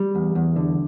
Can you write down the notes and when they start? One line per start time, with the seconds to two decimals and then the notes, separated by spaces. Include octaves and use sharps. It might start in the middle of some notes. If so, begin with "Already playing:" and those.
Already playing: G3
0.15 E2
0.35 E2
0.56 D3